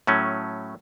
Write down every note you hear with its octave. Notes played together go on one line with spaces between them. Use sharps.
A2 F#3 A3 C#4